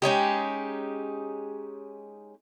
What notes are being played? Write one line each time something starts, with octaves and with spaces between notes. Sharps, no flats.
G#3 C#4 D#4 G4